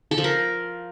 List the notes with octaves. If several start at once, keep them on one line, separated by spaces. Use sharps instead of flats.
A4
F3
A#4